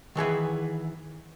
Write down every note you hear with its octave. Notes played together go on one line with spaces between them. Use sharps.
D#3 E3 G#4 B4